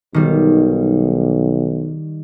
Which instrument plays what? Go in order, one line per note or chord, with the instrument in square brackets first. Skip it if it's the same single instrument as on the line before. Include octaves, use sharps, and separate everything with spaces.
[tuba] B1 [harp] D#3 G3